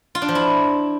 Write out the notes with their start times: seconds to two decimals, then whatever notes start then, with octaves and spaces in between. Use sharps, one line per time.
0.15 F4
0.22 D4
0.28 F3
0.35 E4